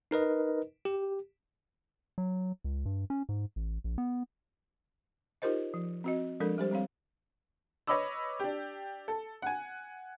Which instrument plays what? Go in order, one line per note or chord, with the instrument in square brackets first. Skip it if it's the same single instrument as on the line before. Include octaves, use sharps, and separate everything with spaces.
[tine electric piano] D#4 A#4 B4 D#5
G4
[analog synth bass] F#3
C#2
G2
C#4
G#2
A1
A#1
B3
[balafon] D#4 F4 G4 A#4 C5 D#5
F3
C4 F#4 D#5
F3 G#3 D4 A4 A#4
G3 G4 C5
G3 C4 C#5 F5
[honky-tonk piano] B4 C#5 D#5 B5 D6 E6
D4 G4
A4
F#5 G#5